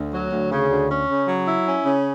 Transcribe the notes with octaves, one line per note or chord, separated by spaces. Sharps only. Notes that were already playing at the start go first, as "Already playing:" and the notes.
Already playing: D2
F#3
D2
C#3
D2
C#4
C#3
F#3
E4
C#4
C#3